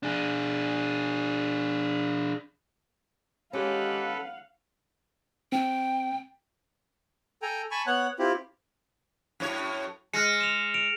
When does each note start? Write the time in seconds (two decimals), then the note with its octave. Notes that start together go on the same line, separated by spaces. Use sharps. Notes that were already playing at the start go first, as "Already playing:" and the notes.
0.03 D4 G#4
3.53 G#3 C#4 G4 A4 B4 F5 F#5
5.52 C4 G5
7.42 A4 G5 G#5 A#5
7.71 G#5 A5 B5 C#6
7.87 B3 C#5 F#5 F#6
8.19 C4 E4 F4 G4
9.40 F#2 A2 C#5
10.13 G#3 F6 A#6 C#7
10.41 E7 F7
10.74 D7 F7